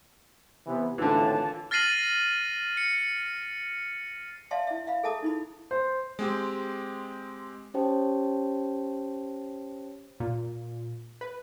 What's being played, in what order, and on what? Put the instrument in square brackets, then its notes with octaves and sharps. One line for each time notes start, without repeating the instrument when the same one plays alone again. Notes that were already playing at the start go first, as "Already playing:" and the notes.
[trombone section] C3 E3 B3
[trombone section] G#1 A2 [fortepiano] D3 E3 [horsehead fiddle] F4 A5
[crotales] F6 A6 A#6 C7 D#7 F#7
C#7
[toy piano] D5 E5 F5 A5 C6
E4 E5
E5 F5 B5
G#4 A4 E5 A5 A#5 D#6
D#4 E4 B5
[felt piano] C5
[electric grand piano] G#3 C4 G4
[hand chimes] C#4 G4 C5 C#5 G5 A5
[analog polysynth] A#2
B4